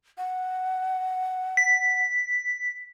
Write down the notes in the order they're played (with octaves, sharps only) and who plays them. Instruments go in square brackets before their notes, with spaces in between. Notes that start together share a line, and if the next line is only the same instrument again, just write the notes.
[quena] F#5
[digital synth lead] B6